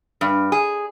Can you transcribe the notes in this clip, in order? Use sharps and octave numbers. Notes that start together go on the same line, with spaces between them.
G2
G#4